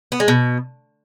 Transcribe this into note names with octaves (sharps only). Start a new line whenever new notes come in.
B3
G#3
B2